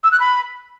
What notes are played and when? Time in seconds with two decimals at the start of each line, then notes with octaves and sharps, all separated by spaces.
0.04 E6
0.12 F#6
0.20 B5